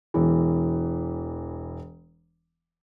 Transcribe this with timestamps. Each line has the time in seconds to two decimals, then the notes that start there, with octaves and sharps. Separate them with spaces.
0.14 E1 E3